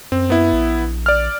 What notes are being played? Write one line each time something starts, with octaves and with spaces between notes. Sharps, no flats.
F#2 C4
B3 E4
A#1
D5 F6